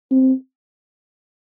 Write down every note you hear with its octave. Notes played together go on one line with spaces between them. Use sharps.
C4